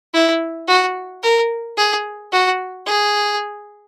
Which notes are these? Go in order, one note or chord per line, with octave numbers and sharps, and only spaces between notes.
E4
F#4
A#4
G#4
F#4
G#4